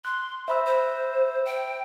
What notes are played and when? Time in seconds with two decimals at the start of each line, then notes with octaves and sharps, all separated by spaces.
0.05 C6 F#6
0.48 C5 E5 B5 E6
0.66 C5
1.45 G5